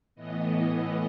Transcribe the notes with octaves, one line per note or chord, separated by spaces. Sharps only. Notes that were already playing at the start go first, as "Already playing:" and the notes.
A2 E3 B3 D#5
D#5